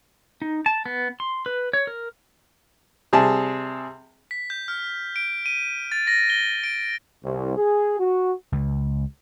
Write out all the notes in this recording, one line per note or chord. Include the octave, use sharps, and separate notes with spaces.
D#4
A5
B3
C6
B4
C#5
A#4
C3 G3 G#4 A5
B6
G6
F6
D7
D#7
A6
A#6
G7
D7
C2
G#4
F#4
C#2